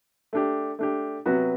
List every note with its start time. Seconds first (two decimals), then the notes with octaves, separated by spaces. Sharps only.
0.33 A3 D4 G4
0.79 A3 D4 G4
1.26 C3 F#3 B3 F#4 B4